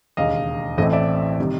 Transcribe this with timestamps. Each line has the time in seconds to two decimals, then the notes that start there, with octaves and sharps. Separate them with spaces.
0.17 E1 D#2 C#3 D#5 F5
0.78 A1 A2 E3 A3 C4 D#5
0.93 D5 E5
1.39 C3 D#3 G3